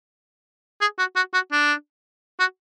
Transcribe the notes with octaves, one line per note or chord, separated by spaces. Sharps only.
G#4
F#4
F#4
F#4
D4
F#4